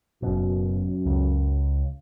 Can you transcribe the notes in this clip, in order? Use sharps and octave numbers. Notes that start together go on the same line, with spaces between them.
F#1 F#2 B2
C#2